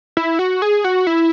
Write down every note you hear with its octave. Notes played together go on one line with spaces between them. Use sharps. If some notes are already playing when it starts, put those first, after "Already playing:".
E4
F#4
G#4
F#4
E4